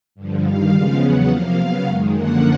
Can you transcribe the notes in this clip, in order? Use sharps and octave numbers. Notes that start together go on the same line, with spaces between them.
G2 D3 F3
G2 D#3 G3 F5
C#3 F3 G#3 B3
E2 C#3 F#3 B3 F#5
C3 F3 A#3 F5
C#3 F#3 B3
F#2 D#3 G#3
F#2 D3 F3 A#3 F#5